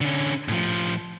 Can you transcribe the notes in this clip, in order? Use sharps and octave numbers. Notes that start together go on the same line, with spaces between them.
D3 C#4
A2 F3